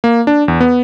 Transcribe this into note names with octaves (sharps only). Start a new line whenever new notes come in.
A#3
D4
E2
B3